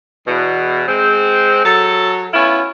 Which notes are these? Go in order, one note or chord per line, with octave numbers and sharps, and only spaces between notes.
E2 B2
G#3 C4
F#3 A4
B3 C#4 E4 F4